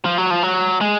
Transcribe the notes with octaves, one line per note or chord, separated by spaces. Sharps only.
F3
F#3
F3
F#3
G#3